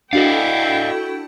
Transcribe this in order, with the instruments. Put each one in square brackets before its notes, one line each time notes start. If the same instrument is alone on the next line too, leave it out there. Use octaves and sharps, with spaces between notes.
[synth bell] D4 F#4 A4 [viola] E4 G5 [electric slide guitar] D5 D#5 F5